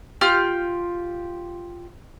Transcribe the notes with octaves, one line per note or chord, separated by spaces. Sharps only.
F4 G4 F6 G6